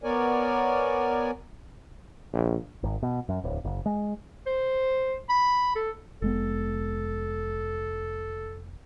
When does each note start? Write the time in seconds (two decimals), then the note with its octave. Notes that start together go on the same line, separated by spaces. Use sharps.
0.03 B3 A#4 C#5 D5 G#5
2.33 A#1
2.83 G#1
3.03 B2
3.29 F#2
3.44 D1
3.65 F#1
3.86 G#3
4.46 C5
5.29 B5
5.75 A4
6.22 F1 G#3 B3 A4